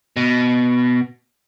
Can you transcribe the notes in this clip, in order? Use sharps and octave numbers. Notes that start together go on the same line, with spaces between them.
B2